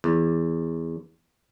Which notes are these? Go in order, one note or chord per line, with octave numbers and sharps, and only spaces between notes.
E2